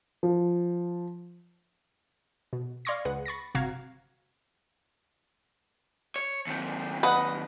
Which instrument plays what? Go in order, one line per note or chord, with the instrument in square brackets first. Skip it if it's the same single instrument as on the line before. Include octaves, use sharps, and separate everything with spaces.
[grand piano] F3
[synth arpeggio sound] B2
D5 F5 C6 C#6 G#6 A#6
C#2 G#4 B4 F#5
B5 C#6 A6 A#6
G1 C3 F#4 F5 A#5 G#6
[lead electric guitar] C#5
D#2 C4
[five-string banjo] B4 D#5 F#5